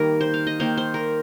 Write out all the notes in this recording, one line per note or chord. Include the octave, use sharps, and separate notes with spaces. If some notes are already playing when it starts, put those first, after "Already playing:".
Already playing: D#3 G3 A#3 A#4
C5
F5
D#5
D#3 A#3 C5
C5
A#4